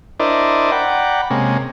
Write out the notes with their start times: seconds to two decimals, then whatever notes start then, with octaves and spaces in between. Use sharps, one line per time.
0.20 D4 E4 A#4 C5 D5 D#5
0.72 D5 F#5 G5 A#5 B5
1.30 C3 G#3 A#3 C#4